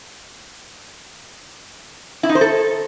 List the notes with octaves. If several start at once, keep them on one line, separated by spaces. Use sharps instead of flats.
E4
D#4
C5
A4